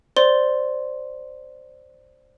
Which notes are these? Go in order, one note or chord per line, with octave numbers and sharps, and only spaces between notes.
C5 D5 C6 G7